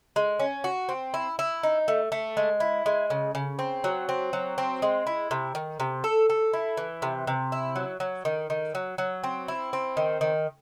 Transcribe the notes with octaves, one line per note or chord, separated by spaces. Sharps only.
G#3
C#4
F#4
C4
E4
E4
D#4
A3
A3
G#3
E4
G#3
C#3
C#3
C4
F#3
C4
F#3
C4
G#3
E4
C3
D#3
C3
A4
A4
E4
E3
C3
C3
E4
F#3
F#3
D#3
D#3
F#3
F#3
C4
E4
C4
D#3
D#3